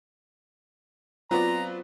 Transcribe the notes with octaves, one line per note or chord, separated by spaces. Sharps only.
F#3 B3 C4 F4 C5 D5 A#5